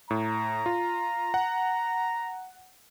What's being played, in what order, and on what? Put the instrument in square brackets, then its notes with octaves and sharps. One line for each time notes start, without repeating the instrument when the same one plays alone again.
[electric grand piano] A2 [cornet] A#5
[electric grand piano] F4
F#5